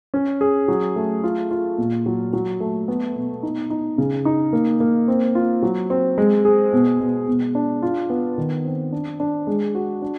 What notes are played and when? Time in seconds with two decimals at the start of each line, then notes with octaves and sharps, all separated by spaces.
0.14 C#4
0.41 G#4
0.68 F#3
0.96 A3
1.24 F4
1.51 F4
1.78 A#2
2.06 F#3
2.33 F#3
2.60 A3
2.88 B3
3.16 B2
3.43 D#4
3.70 D#4
3.98 C#3
4.25 D#4
4.53 A#3
4.80 A#3
5.08 C4
5.35 F4
5.63 F#3
5.90 C4
6.18 G#3
6.45 G#4
6.73 B2
7.00 B2
7.28 B2
7.55 D4
7.82 F4
8.10 B3
8.38 D#3
8.65 C4
8.92 D4
9.20 D4
9.47 G#3
9.75 F#4
10.02 D4